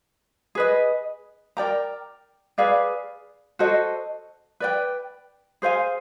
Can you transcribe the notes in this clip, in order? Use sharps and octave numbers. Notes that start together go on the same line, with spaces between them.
G#4 B4 D#5
A#4 D5 G5 A#5
G#4 B4 D5 F5
F#4 A4 C5 D#5
B4 D5 G5
G#4 C5 F5 G#5